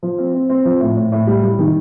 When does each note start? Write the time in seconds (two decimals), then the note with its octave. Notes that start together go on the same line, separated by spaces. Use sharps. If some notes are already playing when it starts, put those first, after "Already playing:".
0.03 F3
0.18 C4
0.35 C4
0.49 C4
0.65 F3
0.81 A2
0.96 A2
1.12 A2
1.27 G3
1.43 G3
1.59 D#3